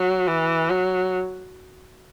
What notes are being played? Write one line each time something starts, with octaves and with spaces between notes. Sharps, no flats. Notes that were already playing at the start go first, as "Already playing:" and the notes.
Already playing: F#3
E3
F#3